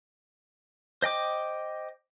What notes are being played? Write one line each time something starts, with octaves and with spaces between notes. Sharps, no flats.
C5 D#5 G5 D6